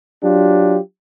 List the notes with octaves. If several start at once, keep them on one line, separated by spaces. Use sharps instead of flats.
F#3 D4 F4 G4